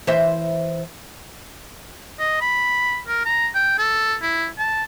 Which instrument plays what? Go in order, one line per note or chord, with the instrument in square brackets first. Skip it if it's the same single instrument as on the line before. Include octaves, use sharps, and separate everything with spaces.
[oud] E3 C5 E5
[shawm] D#5
B5
A#4
A#5
G5
A4
E4
A5